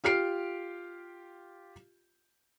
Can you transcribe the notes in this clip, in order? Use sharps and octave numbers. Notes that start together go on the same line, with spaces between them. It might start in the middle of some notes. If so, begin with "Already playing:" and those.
F4 G4 F6 C7 D7